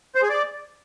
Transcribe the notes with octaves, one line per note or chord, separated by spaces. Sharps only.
C5
G#4
D5